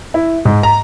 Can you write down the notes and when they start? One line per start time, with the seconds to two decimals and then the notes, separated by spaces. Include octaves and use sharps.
0.14 E4
0.45 G#2
0.63 A#5